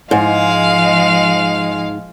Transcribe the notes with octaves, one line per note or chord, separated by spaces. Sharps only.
G#2 F3 G#3 F5